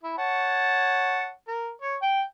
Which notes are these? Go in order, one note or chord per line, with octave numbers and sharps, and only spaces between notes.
E4
C#5 F#5 A5
A#4
C#5
G5